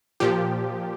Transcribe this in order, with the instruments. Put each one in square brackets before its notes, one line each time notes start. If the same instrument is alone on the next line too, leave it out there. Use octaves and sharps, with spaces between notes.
[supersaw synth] A#2 F3 G4